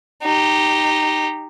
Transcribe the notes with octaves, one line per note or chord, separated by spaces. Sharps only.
D#4 G4